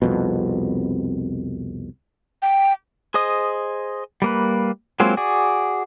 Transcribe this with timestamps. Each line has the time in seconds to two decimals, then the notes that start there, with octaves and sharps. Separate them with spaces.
0.02 C2 F2 B2
2.42 G5
3.14 G#4 C5 D#5 D#6
4.22 G3 A#3 B4
5.00 F#3 G#3 A#3 C4 F4
5.17 F#4 G#4 D5